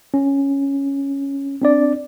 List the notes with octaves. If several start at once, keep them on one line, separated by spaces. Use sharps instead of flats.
C#4
C4 D4 D5